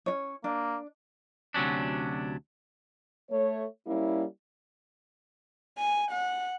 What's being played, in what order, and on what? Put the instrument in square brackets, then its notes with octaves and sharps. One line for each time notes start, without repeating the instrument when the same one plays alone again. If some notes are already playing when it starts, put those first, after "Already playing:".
[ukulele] C#4 D4 C#5
[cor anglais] A#3 [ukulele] D4
[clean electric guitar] D2 C3 F#3 C#4 D4
[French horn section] A3 C#5
G3 A#3 C#4 E4
[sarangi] G#5
F#5